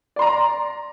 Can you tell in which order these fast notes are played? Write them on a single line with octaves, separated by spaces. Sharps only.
D5 C6 A#5